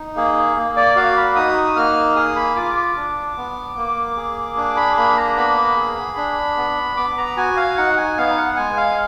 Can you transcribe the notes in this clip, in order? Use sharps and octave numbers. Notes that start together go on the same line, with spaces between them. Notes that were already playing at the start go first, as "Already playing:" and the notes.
Already playing: D#4
A#3 G#4
A#3
D5
F#4 F5
B5
D#4 D#6
A#3 F6
G#4 D#6
B5
F4 D6
D6
D4
B3
A#3
G#4
D4 D6
B5
A#3 B5
A#5
B3 B5
G#4
D4
B3
B3 D6
A#5
F#4 G#5
F5
D#4 F#5
G#5
B3 F5
F#5
G#3 G#5
F5